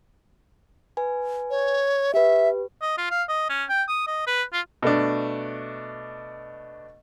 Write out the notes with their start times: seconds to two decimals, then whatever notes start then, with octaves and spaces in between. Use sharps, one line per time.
0.97 B4 G#5
1.50 C#5
2.14 G4 B4 E5
2.82 D#5
2.98 F4
3.11 F5
3.29 D#5
3.49 C#4
3.69 G5
3.88 D#6
4.07 D#5
4.27 B4
4.53 F4
4.83 B2 A3 D4